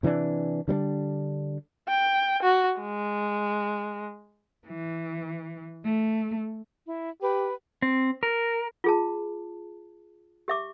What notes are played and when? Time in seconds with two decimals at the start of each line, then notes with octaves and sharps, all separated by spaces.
0.03 C3 E3 C#4 D4
0.68 D3 G3 B3 D4
1.88 G5
2.43 F#4
2.81 G#3
4.66 E3
5.82 A3
6.86 E4
7.22 G4 B4 G5
7.82 C4
8.23 A#4
8.84 F4 G#4 A5
10.48 G4 E5 D6